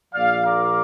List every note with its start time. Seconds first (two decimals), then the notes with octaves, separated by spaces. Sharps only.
0.13 A#1 A#2 F3 D5 F5
0.45 A#4 D5